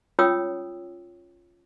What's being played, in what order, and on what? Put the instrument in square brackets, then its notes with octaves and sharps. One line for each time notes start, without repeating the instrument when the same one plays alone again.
[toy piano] C#4 F4 C#5 G5 D#6 E6